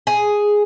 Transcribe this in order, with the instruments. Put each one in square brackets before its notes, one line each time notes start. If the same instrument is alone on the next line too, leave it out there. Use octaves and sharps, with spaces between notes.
[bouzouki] G#4